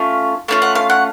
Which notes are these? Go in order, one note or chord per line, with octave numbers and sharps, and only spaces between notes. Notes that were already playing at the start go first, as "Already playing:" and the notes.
Already playing: A3 C#4 F4
A3 C#4 F4 F5
F#5
F5
F#5